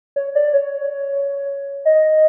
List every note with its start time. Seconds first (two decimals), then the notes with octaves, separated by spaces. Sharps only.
0.16 C#5
0.35 D5
0.53 C#5
1.85 D#5